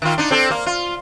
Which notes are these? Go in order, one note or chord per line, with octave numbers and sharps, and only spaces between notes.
D#3 F4
D4 D#4
C4 D4 A4
A#3
F4